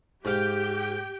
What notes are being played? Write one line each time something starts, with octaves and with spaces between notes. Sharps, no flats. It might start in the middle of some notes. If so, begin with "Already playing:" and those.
G#2 G4 F5 G5